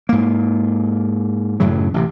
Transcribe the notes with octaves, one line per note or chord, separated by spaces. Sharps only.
G#2 A#3
F#2 A2 C#3 F#3
A1 C3